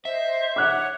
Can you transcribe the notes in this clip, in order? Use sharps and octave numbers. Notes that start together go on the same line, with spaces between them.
C5 D#5 E5
C#5 F#5 D6 F#6